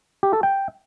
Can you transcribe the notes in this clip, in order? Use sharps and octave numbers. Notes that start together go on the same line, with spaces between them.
G4
A4
G5